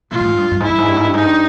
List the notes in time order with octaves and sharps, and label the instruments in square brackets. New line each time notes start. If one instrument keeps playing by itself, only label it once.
[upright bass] A#2 [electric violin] F4
[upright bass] A2
G#2
G2
G2
[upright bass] G#2 [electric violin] E4
[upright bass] G2
G#2
G2
G#2
G2
[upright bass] G#2 [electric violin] D#4
[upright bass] G2